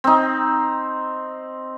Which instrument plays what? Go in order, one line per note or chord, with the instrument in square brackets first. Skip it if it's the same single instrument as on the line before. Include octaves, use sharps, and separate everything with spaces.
[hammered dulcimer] C4 D#4